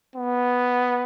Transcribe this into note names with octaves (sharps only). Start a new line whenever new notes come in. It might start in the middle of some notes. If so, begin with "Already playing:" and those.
B3